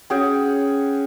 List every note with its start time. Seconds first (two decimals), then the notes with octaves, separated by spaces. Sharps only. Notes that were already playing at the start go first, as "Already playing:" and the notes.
0.10 C#4 F#4 G#4 G5